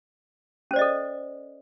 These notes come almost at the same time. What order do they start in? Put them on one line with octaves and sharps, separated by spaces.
C#4 C5 D5 D#5 A4